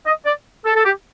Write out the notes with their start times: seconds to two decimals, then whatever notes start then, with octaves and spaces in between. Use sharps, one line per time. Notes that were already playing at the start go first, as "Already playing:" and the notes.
0.06 D#5
0.25 D5
0.65 A4
0.75 A4
0.85 G4